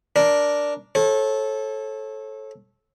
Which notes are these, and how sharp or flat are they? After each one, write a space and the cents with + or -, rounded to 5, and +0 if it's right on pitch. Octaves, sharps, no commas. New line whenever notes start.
D4 -5 A#4 +0
A4 -15 C#5 -35